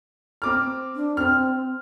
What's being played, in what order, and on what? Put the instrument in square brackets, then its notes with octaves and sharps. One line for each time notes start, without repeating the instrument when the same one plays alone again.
[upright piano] C4 D6 F6
[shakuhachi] D4
[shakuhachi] C4 [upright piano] F6